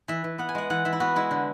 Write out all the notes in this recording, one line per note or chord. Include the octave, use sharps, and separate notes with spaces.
E3 E5
E3
B3 F#5
G#5
G#3 F#5
E3 F#5
E3 E5
E4
B3 F#4
G#3 E4
D3